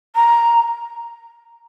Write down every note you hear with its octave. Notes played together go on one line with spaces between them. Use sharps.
A#5